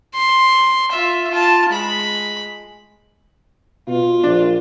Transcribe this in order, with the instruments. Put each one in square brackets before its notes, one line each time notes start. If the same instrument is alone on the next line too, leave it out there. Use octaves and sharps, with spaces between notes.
[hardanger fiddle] C6
F4 E5
F4 A5
G#3 B5
[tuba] B2 [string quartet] F4
[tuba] A#1 [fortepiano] D4